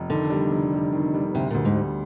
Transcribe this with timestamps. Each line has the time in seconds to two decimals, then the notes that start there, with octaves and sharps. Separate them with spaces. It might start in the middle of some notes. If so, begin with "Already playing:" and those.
Already playing: F1
0.09 D3 D#3
0.30 G3
0.52 F1
0.73 G3
0.93 D#3
1.14 G3
1.34 D2 C3
1.51 D2 A#2
1.65 G#2
1.76 G3